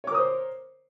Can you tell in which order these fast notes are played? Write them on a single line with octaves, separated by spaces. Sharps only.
C#5 D6 A#4 D#6 C5